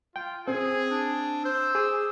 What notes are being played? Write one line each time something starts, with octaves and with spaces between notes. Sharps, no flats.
F4 G5
C4 G#4
D4
C5 E6
G#4 D6 D#6